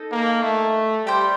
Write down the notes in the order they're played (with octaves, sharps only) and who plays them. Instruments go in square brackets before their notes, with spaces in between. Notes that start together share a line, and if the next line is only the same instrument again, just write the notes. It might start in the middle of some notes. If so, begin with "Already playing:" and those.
Already playing: [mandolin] D#4 A4 D#5
[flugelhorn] A#3
A3
[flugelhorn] G3 [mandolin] G4 C5 G5